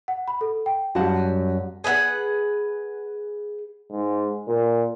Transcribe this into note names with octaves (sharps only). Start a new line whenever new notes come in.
F#5
B5
A4
G5
F#2 G3 F#4 F#5 A5
G#4 B4 D#5 F#5
G#2
A#2